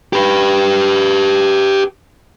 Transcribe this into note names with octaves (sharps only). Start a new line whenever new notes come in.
G4 B4